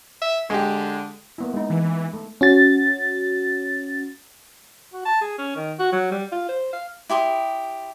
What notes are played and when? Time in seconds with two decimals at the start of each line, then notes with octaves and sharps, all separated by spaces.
0.21 E5
0.50 D3 G#3 G4
1.38 A#3 B3 E4
1.54 G#3 D#4
1.70 E3
2.14 A3
2.41 C#4 F#4 A6
4.93 F#4
5.05 A5
5.21 G#4
5.38 C#4
5.56 D#3
5.79 F#4
5.92 F#3
6.11 G3
6.32 F4
6.48 C5
6.73 F5
7.10 E4 G4 C6 D#6